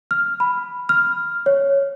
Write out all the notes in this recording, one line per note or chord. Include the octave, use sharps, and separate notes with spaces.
F6
B5
F6
C#5